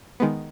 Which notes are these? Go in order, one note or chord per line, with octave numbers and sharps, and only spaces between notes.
D#3 G#3 B3